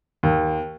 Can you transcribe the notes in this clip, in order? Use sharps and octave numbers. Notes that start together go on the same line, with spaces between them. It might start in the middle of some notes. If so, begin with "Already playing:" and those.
D#2